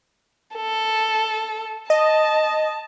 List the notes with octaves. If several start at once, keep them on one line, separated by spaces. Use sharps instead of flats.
A4
D#5 A5